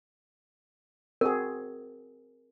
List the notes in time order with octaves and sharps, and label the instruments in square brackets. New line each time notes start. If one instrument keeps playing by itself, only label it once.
[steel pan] C4 F#4 G#4 [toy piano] A#4